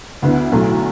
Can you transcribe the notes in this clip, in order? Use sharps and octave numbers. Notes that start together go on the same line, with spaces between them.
D2 D3 B3 E4
B1 A2 F#3 A3